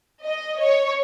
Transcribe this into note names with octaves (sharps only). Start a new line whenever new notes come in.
D#5
C#5